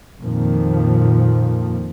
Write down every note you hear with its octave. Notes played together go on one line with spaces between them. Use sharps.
F2 A#2 D#3 F3